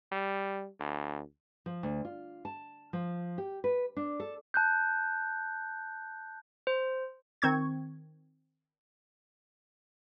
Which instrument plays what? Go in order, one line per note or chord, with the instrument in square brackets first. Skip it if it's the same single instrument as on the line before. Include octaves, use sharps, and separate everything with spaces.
[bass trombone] G3
D2
[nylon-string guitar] F3
D2
F4
A5
F3
G4
B4
D4
A4
[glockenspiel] A5 F#6 G6
[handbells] C5
[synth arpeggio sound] D#3 C4 C#6 G#6